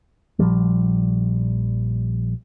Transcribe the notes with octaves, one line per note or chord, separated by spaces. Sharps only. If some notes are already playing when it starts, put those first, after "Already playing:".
A#1 F3 G3